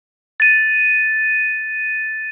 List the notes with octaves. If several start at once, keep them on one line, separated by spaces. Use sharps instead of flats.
A6 D#7